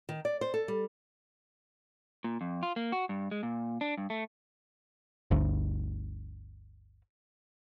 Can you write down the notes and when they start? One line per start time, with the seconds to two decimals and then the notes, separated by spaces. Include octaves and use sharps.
0.09 D#3
0.25 D5
0.41 C5
0.54 A4
0.68 G3
2.24 A#2
2.41 F2
2.63 F4
2.76 A#3
2.92 F#4
3.09 G2
3.31 G#3
3.43 A#2
3.81 D4
3.98 G2
4.10 A3
5.31 G1 D2